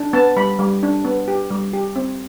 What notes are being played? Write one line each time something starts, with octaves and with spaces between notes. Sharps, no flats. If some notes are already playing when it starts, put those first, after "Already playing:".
Already playing: D4
B3 A5
G3 B5
G3
D4
B3
G4
G3
G4
C4